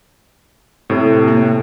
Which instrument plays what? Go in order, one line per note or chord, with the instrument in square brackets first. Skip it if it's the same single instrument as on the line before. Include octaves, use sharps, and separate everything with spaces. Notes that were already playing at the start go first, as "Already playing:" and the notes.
[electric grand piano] A2 C3 A3
[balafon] A#3